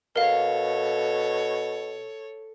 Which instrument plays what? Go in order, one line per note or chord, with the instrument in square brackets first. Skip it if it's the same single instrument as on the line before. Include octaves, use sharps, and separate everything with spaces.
[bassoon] B2 [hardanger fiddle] A4 C#5 [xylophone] A#4 F5